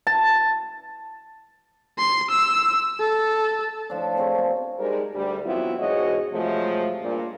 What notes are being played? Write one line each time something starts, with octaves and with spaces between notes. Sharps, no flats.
A5
C6
E6
A4
A2 F3 D4
C4 G#4 C#5
B2 C4 A#4
G3 G#3 D#4 A#4 C5
D2 G3
E3 F#3 B3 C4 E4 F4
E2 G#2 B2 F#4 C#5 D#5
C3 F3 F#3 G#3 A3
G2 A#2